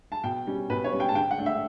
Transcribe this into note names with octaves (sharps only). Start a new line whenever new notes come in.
A5
B2 G5
G3 C#4
B2 B4
C#5
G3 C#4
G5
A5
D3 G5
F#5
A3 D4
E5